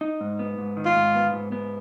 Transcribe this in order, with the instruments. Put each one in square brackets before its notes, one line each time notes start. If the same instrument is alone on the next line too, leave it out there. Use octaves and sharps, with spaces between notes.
[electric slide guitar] D#4
G#2
B3
G#2
D#3
[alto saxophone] F4
[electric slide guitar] G#2
B3
G#2
B3